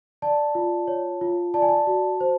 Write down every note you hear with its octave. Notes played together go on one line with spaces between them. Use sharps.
D5 A5
F4
C#5
F4
D5 A5
G#5
A5
F#4
C5